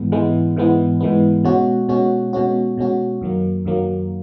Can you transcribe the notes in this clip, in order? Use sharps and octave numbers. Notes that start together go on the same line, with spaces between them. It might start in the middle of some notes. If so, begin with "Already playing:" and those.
Already playing: G#2 E3 G#3 B3
G#2 E3 G#3 B3
G#2 E3 G#3 B3
G#2 E3 G#3 B3
B2 G#3 C#4 F#4
B2 G#3 C#4 F#4
B2 G#3 C#4 F#4
B2 G#3 C#4 F#4
F#2 D#3 F#3 A#3
F#2 D#3 F#3 A#3